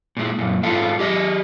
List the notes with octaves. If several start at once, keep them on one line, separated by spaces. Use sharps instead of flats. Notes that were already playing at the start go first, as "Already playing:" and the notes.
A#2 G#3
F#2 A#2
G#2 G#3 F4 A4
G4 G#4 D#5